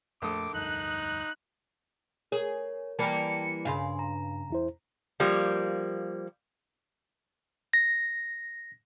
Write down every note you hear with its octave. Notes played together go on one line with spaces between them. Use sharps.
A#1 F2 A3 A4 D6 D#6
F1 D2 G2 D#4 F#6
G#4 A#4 C#5
E3 G3 A#3 G5 A5 C#7
G2 C#3 F5 G#5 C6
A#5
E2 E4 C5
F3 G3 A#3
A#6